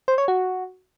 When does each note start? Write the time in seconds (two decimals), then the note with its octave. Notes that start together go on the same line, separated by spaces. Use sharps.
0.08 C5
0.18 C#5
0.28 F#4